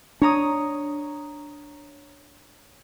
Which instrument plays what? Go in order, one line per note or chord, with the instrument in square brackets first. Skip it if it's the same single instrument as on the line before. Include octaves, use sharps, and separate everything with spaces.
[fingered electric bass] D4 [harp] C#5 A#5 D#6